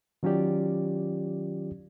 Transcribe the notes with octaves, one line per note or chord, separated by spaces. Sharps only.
D#3 F#3 C#4 F4 G4 D5